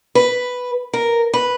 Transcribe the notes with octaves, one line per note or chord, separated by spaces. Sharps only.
B4
A#4
B4